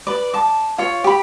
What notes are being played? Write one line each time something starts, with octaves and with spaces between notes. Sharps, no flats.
B4 D5
A5 D6
F4 C#5
G4 B5